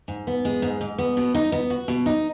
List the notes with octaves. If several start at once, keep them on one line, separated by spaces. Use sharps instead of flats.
G#2
B3
G#3
G#2
G#2
B3
B2
D#4
B3
F#4
B2
D#4